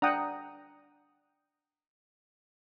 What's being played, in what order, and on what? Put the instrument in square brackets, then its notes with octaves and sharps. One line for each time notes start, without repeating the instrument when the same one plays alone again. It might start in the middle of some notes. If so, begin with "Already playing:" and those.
[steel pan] D4 F#5 G5 [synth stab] A#5 D#6